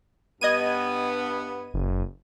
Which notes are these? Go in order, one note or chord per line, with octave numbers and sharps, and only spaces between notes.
G2 B3 D#5 G#6 D#7
F#1